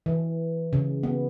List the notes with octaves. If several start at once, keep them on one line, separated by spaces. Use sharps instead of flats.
E3
C#3
B3